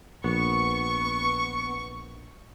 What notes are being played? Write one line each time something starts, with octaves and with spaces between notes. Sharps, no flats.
A#1 B3 C#6